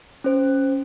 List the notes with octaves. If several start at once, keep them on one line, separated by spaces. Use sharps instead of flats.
C#4 C5